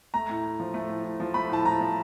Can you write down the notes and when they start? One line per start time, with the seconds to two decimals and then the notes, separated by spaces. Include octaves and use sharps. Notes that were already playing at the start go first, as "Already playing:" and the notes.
0.14 A3 A#5
0.29 A2
0.44 A2
0.60 F3
0.74 A3
0.89 A2
1.04 A2
1.20 F3
1.34 A3 B5
1.49 A2 A5
1.65 A2 A#5
1.81 F3